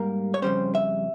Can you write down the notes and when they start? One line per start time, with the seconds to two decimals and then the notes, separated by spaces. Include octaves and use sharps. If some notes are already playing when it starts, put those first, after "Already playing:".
Already playing: G#2 G3 A#3 A#4
0.34 C#5
0.42 F2 C#3 G3 C#4 C5
0.75 E5